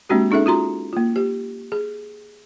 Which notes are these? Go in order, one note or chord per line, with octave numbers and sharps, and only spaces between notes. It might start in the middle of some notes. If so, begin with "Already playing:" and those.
G#3 A#3 C4 D4 F#4 G4
C#4 D#4 G#4 A4 E5
F4 F#4 A#5 C6
A#3 F4
G4
G#4